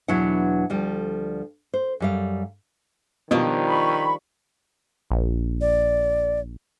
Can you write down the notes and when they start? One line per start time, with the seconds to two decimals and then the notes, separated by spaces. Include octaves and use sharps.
0.08 E2 B2 F#3 D4 E4 F#5
0.70 D2 F3 G3
1.74 C5
2.00 F#2 G3 F5
3.31 B2 D#3 F3 G3 D4
3.68 B5 C#6
5.11 A#1
5.61 D5